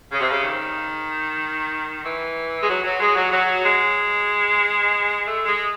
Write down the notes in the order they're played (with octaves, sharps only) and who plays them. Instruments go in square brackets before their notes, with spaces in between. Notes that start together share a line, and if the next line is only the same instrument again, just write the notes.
[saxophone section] C#3
C3
C#3
D#3
E3
G#3
F#3
F#3
G#3
F#3
F#3
G#3
A3
G#3